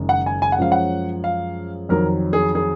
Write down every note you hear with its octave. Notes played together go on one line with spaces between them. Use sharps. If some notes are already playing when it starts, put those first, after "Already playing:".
Already playing: F#1 F#2 D#3 G#3
F#5
G#5
G#5
F#5
F#2 F3 G#3 C#4 F5
F#5
F5
F2 D#3 F#3 A#4
G#4
G#4